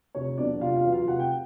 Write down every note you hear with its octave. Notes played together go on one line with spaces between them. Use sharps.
F1 C#5
E2 B2 F#3 D4 D5
F1 F4 F5
F4 F5
E2 B2 F#3
F4 F5
F1 F#5
G5